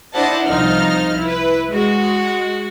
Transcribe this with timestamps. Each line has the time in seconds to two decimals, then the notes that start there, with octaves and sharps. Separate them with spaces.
0.14 D4 E4 C5 D#5 F#5 A5
0.47 C2 F3 D#4 C5 F6
1.19 E4 B4
1.70 G#3 F#4